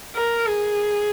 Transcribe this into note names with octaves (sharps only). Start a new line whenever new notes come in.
A#4
G#4